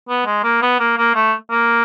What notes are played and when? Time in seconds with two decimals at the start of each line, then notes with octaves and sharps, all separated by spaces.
0.09 B3
0.26 G#3
0.43 A#3
0.62 B3
0.80 A#3
0.98 A#3
1.15 A3
1.51 A#3